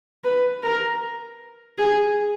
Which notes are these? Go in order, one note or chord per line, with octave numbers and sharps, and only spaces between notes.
B4
A#4
G#4